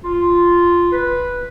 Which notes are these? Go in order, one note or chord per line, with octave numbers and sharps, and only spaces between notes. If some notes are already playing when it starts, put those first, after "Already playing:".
F4
B4